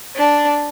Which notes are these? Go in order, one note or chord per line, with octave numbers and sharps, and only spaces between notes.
D4